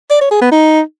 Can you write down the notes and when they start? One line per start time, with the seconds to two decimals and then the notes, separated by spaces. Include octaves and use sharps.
0.10 D5
0.21 C#5
0.31 G#4
0.41 B3
0.52 D#4